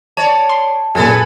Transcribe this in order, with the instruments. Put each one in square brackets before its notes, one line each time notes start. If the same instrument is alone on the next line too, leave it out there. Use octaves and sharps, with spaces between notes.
[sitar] C#5 D5 [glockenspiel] A5
[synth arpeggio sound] C6
[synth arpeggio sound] F#2 A#2 [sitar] G#4 A4 B4 [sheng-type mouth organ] G#5